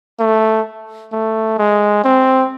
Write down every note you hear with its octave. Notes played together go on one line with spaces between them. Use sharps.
A3
A3
G#3
C4